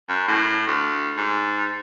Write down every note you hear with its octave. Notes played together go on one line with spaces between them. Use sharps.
F#2
A2
D2
G#2